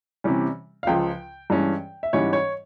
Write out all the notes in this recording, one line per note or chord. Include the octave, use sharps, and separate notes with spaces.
C3 E3 G3 C#4
F5
C#2 C#3 F3 G5
G2 E3 G#3 C#4
E5
G#2 E3 G3 C#4 C#5
C#5